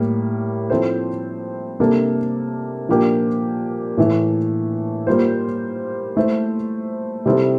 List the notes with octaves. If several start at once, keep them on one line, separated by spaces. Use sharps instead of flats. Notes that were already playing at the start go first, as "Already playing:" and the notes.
Already playing: A2 G3 A#3
F3 C4 E4 A4 C5
C3 G3 A#3 D4 A4
A#2 F3 A#3 D4 G4
A2 E3 A3
G3 A#3 F4 C5
A3 E4 A4 C5
C3 G3 C4 E4 A4